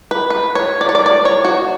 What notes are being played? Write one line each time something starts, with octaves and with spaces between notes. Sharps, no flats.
B4
B4
C#5
D5
C#5
D5
D5
C#5
F#4